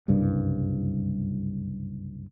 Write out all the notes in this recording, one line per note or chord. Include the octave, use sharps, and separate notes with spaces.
F#1 C2 G2